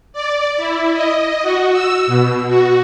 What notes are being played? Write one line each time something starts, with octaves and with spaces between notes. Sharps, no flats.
D5
E4
D#5
F#4
E6
B2
F#4